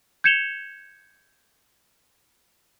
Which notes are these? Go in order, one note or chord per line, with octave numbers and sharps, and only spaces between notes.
G6 G#6 C#7 E7 F7 G7